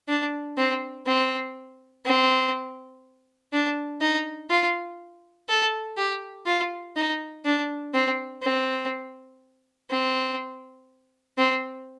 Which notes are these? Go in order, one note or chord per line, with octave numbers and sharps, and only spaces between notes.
D4
C4
C4
C4
D4
D#4
F4
A4
G4
F4
D#4
D4
C4
C4
C4
C4